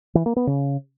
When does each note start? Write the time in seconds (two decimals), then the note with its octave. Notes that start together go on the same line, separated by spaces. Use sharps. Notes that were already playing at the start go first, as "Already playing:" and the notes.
0.15 E3
0.26 A#3
0.36 B3
0.47 C#3